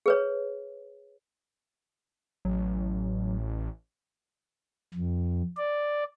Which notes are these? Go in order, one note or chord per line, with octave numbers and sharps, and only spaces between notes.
G#4 B4 C#5
A1 F#3
F2
D5